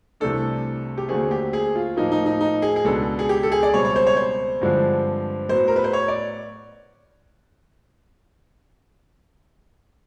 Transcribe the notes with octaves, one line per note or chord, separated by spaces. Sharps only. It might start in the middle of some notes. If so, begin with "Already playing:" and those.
C2 C3 E3 A3 D4 A4
G4
D#2 D3 F#3 A3 C4 G#4
G4
G#4
F4
A2 F3 A#3 D#4
D#4
D#4
D#4
G#4
G#4
C#2 B2 F#3 B3 D4 A4
G#4
G4
A4
G#4
D5
C#2 B2 G3 C4 C#5
C#5
C5
C#5
C5
G2 D3 F3 G#3 C4
A2 F#3 B3 C5
A#4
B4
C5
C#5
D5